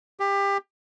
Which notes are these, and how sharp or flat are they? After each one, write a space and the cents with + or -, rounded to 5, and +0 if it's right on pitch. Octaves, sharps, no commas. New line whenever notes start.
G4 +25